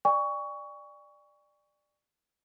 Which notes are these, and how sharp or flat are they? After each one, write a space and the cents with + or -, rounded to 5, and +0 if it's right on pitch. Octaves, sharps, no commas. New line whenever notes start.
D5 +15 G#5 -45 C#6 +20